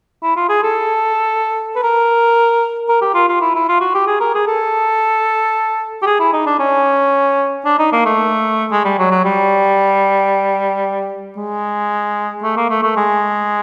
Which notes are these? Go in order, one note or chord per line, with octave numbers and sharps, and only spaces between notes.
E4
F4
G#4
A4
B4
A#4
A#4
G4
F4
F4
E4
E4
F4
F#4
G4
G#4
A#4
G#4
A4
G4
G#4
E4
D#4
D4
C#4
D4
D#4
A#3
A3
G#3
G3
F#3
F#3
G3
G#3
A3
A#3
A3
A3
G#3